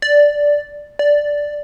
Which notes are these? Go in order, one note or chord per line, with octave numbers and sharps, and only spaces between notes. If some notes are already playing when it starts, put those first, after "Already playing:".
D5
D5